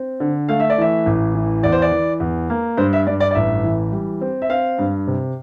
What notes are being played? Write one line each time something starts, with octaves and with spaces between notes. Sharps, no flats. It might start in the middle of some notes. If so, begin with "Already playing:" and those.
Already playing: C4
D3
A3 F5
E5
D5
E3 E5
A1
E3
E2 D5
C5
D5
E3
E2
A#3
G2 C5
E5
G2 D5
D5
D5
A1 E5
E3
G3
C4
E5
C4 F5
G2
C3